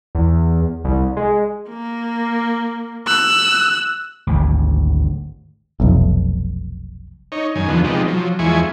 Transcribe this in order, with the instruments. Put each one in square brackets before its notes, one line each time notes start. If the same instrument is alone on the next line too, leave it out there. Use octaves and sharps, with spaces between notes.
[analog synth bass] E2
C2
G#3
[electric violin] A#3
E6 F#6
[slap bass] G#1 D2
[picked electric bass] F1 B1
[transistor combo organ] D#4 C#5
F#2 D#3 G#5
E2 D3 F3 B3
C3 F3 G#3 B3 D#4 G4
F3 F#3
E2 F3 G#3 E4 G#5 C#6